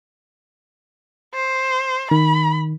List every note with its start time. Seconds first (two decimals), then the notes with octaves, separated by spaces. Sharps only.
1.35 C5
2.11 D#3 B5